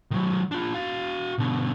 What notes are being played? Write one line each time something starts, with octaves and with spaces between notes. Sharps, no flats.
D#3 F#3
D4 F4
F#4 F5
B2 D3